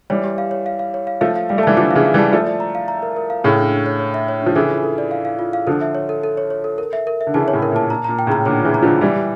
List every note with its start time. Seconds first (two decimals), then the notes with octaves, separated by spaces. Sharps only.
0.10 E3 G3 C#5
0.24 G4
0.38 F5
0.51 C#5
0.66 F5
0.79 F5
0.94 C#5
1.07 F5
1.21 F3 A3 F5
1.36 F5
1.49 G3 F5
1.58 A3
1.63 E3 G3 A5
1.77 D3 F3 D6
1.91 C#3 E3 F5
2.05 F5
2.14 E3 G3
2.19 A5
2.33 F3 A3 D5
2.47 D5
2.60 A#5
2.75 F5
2.88 A#5
3.02 A#4
3.16 A#4
3.30 F5
3.44 A2 C#3 A4
3.59 D4
3.72 D4
3.86 C#5
3.99 C#5
4.14 E5
4.28 C#5
4.42 F3 D4
4.56 C#3 E3 A4
4.70 F4
4.84 A4
4.98 D5
5.11 F5
5.25 F5
5.39 F4
5.53 F5
5.67 D3 F3 A4
5.81 E5
5.95 C#5
6.09 A4
6.24 A4
6.37 C#5
6.50 C#5
6.64 A4
6.78 A#4
6.93 E5
7.07 A#4
7.21 E5
7.27 D3
7.34 C#3 E3 A5
7.48 C#5
7.53 A2 C#3
7.62 A#4
7.72 A#2
7.76 A5
7.90 A#2 A#5
8.04 A#2 A#5
8.19 G5
8.27 A2 C#3
8.32 A#5
8.46 A#2 D3 C#5
8.60 C#3 E3 F4
8.74 A#5
8.82 D3 F3
8.88 F4
9.01 E3 G3 G4
9.16 G4